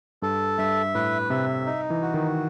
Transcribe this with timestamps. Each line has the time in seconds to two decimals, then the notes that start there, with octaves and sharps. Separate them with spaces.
0.22 G2 A4
0.58 G2 E5
0.95 A2 B4
1.30 C3 E5
1.66 D#4
1.90 E3
2.02 F#4
2.14 D#3